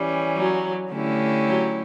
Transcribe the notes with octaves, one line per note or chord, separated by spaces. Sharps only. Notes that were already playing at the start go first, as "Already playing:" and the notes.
Already playing: E3 G3 C#4
F#3
D3 A3 C#4 E4 G4
F#3